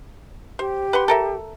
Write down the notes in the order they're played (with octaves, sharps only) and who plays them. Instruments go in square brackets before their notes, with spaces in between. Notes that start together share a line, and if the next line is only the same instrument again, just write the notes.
[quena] G4 [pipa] C5
[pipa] B4 F#5 C6
A4 A#4 E5